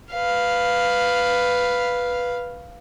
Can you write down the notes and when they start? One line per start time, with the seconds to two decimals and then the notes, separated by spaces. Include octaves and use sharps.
0.13 B4 F5